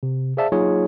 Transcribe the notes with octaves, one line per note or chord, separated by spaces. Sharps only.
C3
G#4 C5 D5 E5 F5 A5
F#3 A#3 D#4 F4 G#4 C#5